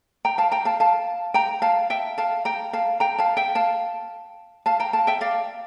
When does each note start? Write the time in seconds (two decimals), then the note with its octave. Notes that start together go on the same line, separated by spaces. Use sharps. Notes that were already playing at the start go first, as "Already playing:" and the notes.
0.25 G5 A#5
0.38 F5 A5
0.51 G5 A#5
0.65 F5 A5
0.80 F5 A5
1.34 G5 A#5
1.62 F5 A5
1.90 E5 G5
2.18 F5 A5
2.45 G5 A#5
2.73 F5 A5
3.00 G5 A#5
3.18 F5 A5
3.37 E5 G5
3.55 F5 A5
4.66 F5 A5
4.80 G5 A#5
4.93 F5 A5
5.07 E5 G5
5.21 D5 F5